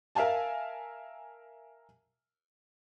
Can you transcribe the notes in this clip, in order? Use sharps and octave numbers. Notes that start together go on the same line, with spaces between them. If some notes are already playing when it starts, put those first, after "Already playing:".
A#4 E5 F5 G#5 A5